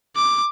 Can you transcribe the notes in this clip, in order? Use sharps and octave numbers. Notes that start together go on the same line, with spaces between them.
D6